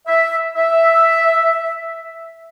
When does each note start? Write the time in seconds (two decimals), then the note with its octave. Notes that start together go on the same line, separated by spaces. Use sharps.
0.07 E5
0.55 E5